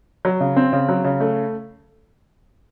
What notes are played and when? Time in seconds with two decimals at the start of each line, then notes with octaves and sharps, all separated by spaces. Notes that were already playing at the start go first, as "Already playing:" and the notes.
0.25 F#3
0.40 C#3
0.56 C4
0.73 C#3
0.89 F#3
1.04 C#3
1.20 A3